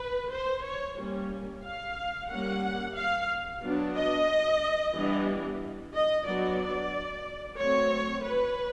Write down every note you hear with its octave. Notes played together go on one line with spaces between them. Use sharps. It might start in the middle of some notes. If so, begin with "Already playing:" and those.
Already playing: B4
C5
C#5
G3 A#3 C#4
F5
G3 A#3 C#4 F#5
F5
F#3 B3 D4
D#5
E3 G3 B3 D4
D#5
F#3 B3 D4 D5
F#3 A3 C4 C#5
B4